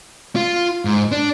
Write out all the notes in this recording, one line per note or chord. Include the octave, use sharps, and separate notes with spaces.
F4
G#2
D4